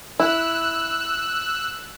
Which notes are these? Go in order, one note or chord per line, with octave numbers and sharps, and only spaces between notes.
E4 E6 F#6